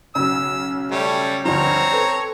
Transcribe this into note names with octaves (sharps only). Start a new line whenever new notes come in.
B1 C#3 E6
G3 A3 C#5
D2 G2 F3 C4 C#5 A#5
A4 B4